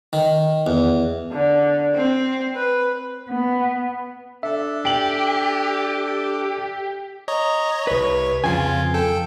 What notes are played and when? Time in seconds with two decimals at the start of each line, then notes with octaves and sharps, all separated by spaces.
0.13 D#3
0.66 E2
1.32 D3
1.95 C4
2.56 B4
3.29 B3
4.43 D4 A4 E5
4.85 G4 G5 F#7
7.28 C#5 D#5 A#5
7.87 C2 B4 C#5
8.44 F2 C#3 F4 G#5
8.94 A4 G5